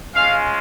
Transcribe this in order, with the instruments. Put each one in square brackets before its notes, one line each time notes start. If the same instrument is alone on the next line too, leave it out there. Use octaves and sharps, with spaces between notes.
[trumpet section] G#3 C#4 F4 F5